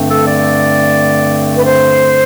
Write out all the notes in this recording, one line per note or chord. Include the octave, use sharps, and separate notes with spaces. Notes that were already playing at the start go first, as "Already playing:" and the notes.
Already playing: G2 D3 A3 C4
A4
D5
B4
C5